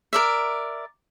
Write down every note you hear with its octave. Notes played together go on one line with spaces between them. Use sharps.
A#4 D5 E5